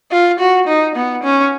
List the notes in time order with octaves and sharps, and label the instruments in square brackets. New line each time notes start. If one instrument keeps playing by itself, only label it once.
[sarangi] F4
F#4
D#4
B3
C#4